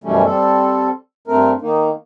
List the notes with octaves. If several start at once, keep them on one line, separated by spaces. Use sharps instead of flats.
F#2 B2 E3 G3 A3 C#4
G3 C4 A4
G2 A3 C4 A#4
D#3 A#3 D#4